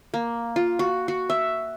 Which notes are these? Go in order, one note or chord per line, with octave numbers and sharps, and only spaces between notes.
A#3
F4
F#4
F#4
E5